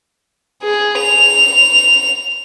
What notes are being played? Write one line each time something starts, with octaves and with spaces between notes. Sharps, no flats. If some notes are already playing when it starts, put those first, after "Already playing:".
G#4
F7